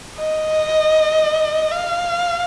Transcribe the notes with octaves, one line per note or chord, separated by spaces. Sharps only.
D#5
F5